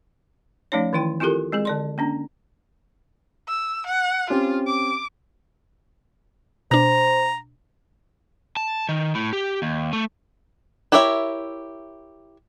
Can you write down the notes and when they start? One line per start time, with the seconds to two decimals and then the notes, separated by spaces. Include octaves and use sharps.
0.72 F3 A3 C#4 D#4 C#5
0.93 D#3 E3 E4 G5
1.20 C4 E4 F4 G4 A4 A#4
1.52 G#3 C4 G#4
1.65 D3 D5 C6
1.98 A#3 C#4 D4
3.48 E6
3.87 F#5
4.30 C4 C#4 F4 G4
4.67 D6
6.71 B2 D4 C5 A#5
8.57 A5
8.89 D#3
9.15 A2
9.33 G4
9.62 D#2
9.93 A3
10.92 E4 G4 A#4 C#5 E5